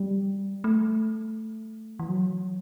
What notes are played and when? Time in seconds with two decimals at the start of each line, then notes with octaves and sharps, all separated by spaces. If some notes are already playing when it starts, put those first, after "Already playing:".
Already playing: G3
0.64 A3
1.99 E3
2.09 F#3